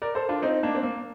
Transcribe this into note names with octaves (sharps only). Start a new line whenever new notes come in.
A#4 D5
A4 C5
D4 F4
C4 D#4
A#3 D4
C4
A#3